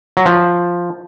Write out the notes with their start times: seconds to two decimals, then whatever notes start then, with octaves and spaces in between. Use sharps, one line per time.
0.17 F#3
0.26 F3